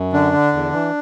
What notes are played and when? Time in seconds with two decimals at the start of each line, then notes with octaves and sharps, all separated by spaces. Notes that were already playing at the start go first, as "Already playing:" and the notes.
Already playing: F#2
0.13 D3 D4
0.33 D3
0.53 E2
0.73 E3